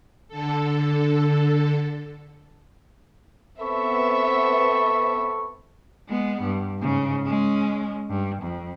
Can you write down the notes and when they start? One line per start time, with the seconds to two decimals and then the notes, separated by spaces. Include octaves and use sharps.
0.28 D3 A4
3.61 B3 C4 A4 E5 B5 C#6
6.09 G#3 B3
6.43 G2
6.79 G#2 C#3
7.26 G#3 C#4
8.10 G2
8.43 F2